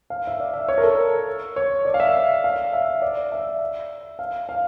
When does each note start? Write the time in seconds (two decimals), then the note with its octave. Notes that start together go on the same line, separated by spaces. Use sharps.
0.10 F5
0.27 E5
0.40 D5
0.54 E5
0.69 C#5
0.78 A#4
0.83 A4
1.56 C#5
1.85 D5
1.94 F5
2.00 E5
2.44 F5
2.73 E5
3.02 D5
3.32 E5
4.19 F5
4.49 F5